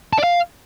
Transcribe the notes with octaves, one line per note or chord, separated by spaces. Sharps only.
A5
D5
F5